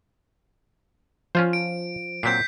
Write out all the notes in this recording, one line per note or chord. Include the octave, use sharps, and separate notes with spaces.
F3 C#4 F4 C5
D7
A#2 F#3 C4 G6 B6 C7